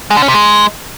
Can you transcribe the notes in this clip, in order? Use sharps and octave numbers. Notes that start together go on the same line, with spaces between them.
G#3
D3
C#4
C3
G#3